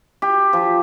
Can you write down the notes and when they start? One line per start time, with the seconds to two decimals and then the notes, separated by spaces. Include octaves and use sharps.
0.22 G4
0.53 F3